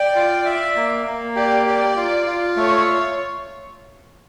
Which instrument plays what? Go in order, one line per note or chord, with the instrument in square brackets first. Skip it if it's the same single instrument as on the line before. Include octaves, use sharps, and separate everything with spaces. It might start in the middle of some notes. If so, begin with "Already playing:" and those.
Already playing: [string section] D5 [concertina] G5
[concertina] F4
E5
A#3
A#3
[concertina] G4 [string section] D5
[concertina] G4 [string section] D5
[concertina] F4
F4
[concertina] A3 [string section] C#5